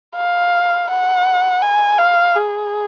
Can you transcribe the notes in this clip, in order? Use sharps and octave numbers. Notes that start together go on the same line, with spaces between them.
F5
F#5
G#5
F5
G#4